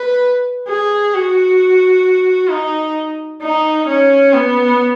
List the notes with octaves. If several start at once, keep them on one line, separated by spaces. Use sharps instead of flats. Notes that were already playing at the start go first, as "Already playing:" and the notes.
Already playing: B4
G#4
F#4
D#4
D#4
C#4
B3